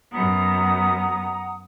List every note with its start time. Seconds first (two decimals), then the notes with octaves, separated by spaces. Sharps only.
0.12 F#2 B3 F#5 A#5 D#6